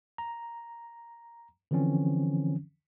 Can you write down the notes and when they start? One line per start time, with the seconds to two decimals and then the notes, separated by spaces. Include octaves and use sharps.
0.18 A#5
1.71 D3 E3 F3 C4 C#4